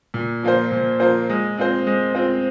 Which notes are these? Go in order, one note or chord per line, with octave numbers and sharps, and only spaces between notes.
A#2
F3 A#3 F4 C5
A#2
F3 A#3 F4 C5
G#3
C4 F4 C5
G#3
C4 F4 C5